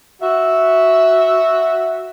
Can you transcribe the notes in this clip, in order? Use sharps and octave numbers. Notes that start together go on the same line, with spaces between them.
F#4 E5